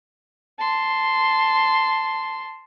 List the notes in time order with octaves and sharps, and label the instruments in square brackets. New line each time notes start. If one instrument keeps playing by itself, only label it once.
[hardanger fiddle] A5 C6